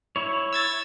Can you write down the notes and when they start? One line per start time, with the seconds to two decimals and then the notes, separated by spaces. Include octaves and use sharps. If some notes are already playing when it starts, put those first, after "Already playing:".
0.16 E4 C#5
0.53 E6 G#6 A6